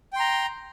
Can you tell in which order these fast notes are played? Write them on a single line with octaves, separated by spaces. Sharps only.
G5 C6 A#5